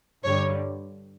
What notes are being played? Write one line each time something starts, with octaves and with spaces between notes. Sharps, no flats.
G2 D3 G3 C#5